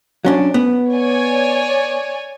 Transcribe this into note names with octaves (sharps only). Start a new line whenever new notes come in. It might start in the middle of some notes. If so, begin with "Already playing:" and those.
F#3 C#4 D4
B3
C#5 D5 G#5